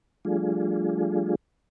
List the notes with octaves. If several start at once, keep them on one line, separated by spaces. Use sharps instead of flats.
F3 G3 A3 D4 F4 G#4